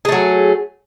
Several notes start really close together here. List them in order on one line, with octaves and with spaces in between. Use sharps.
G#4 A3 F#3